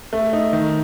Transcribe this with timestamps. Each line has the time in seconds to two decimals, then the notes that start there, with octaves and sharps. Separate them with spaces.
0.13 A3
0.33 D#4
0.53 D#3